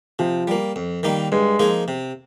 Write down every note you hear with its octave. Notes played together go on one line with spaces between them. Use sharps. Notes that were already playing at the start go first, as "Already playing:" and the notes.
C3 F3
G3 A#3
F2
D#3 G3 A#3 D#4
G2 G#3
F3 A#3 D#4 G#4
C3